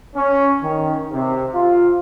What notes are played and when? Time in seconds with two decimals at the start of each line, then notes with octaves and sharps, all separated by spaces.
0.14 C#4
0.61 D#3
1.11 C3
1.53 F4